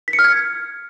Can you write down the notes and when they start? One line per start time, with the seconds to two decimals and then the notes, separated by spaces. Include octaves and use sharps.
0.08 B6
0.13 C#7
0.19 F6
0.24 G#6